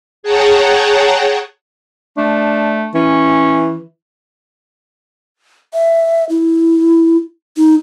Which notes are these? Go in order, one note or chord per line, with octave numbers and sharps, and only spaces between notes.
G#4 C#5 F#5 G5 A5 A#5
A3 D4
E3 C#4
E5
E4
D#4